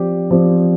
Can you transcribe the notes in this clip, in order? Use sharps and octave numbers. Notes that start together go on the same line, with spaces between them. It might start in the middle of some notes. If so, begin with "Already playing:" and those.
Already playing: F3 C4 G4 D5
F3 C4 G4 D5